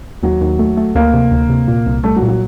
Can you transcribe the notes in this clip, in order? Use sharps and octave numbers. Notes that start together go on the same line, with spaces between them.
D#2 F#3
D#2
A3
A3
D2 A#3
C3
D2
C3
A#2
C2
G3 A3
F#3
A#2
F#3